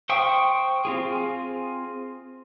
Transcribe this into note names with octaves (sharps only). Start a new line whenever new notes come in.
C5 F5 G5 C#6 D#6
C4 F4 G#4